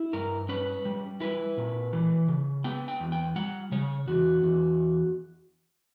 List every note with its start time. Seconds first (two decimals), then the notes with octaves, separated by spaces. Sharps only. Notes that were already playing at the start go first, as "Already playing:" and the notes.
Already playing: E4
0.13 G2 A#4
0.49 C#4 B4
0.85 G3
1.20 E4 B4
1.57 A#2
1.93 E3
2.28 C#3
2.64 B3 G5
2.88 G5
3.00 E2
3.12 G5
3.36 G3 F#5
3.72 C#3 C#5
4.08 E2 F#4
4.43 E2